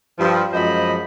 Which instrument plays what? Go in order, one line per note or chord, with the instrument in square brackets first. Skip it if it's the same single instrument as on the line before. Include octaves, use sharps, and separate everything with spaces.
[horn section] G2 F3
F#2 F3 G#3 C5 D#5 B5